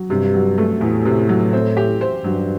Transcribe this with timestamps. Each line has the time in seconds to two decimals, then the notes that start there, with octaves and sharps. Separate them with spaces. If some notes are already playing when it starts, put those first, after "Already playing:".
Already playing: F#3
0.10 G2 C3
0.34 F#3
0.58 A3
0.81 E2 A2
1.05 C3
1.29 F#3
1.53 C4
1.77 G4
2.01 C5
2.24 G2 F#3